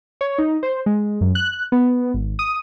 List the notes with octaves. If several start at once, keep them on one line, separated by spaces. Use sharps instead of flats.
C#5
D#4
C5
G#3
F#2
F#6
B3
G#1
D#6